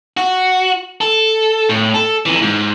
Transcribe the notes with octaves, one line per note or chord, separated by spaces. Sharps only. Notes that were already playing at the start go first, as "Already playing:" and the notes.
F#4
A4
A2
A4
F2 E3
G#2